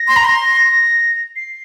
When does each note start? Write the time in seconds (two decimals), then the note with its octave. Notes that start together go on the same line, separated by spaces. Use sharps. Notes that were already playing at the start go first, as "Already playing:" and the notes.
Already playing: A#6
0.08 C6
0.16 A#5
0.24 C6
1.36 C7